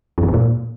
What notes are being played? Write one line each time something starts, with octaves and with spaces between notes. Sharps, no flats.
F2
E2
G#2
A#2